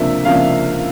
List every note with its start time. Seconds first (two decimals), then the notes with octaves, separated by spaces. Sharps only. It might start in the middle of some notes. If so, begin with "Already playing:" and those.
Already playing: C#2 C3 F3 A#3 D4 E5
0.25 C#2 C3 F3 A#3 D4 F5